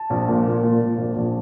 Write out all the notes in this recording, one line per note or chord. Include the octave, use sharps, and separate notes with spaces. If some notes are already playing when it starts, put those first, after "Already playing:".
Already playing: A5
A#1
A#2
A#2
A#2
A#2
A#1
A#1